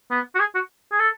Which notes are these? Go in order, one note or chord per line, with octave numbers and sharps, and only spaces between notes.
B3
F#4
G#4
F#4
G#4
A4